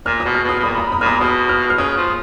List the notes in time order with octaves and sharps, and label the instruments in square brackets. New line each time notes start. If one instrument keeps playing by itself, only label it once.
[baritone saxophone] A#2 [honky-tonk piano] F6
[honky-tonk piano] D#6
[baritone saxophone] B2
[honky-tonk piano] F6
[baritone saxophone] B2 [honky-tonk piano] D#6
[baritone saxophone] B2
[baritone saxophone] A#2 [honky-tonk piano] B5
[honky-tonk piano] A#5
B5
[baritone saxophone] A#2 [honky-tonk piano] D#6 F6
[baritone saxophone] B2 [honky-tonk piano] D#6
[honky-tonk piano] F6
F6
[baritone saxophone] C#3 [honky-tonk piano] D#6
[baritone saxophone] F3